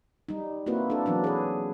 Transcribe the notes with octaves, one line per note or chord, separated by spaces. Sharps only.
G3 D#4
A#3 C4 E4 F#4 B4
D4 A4
E3 F#3 B3 D4
G#4 B4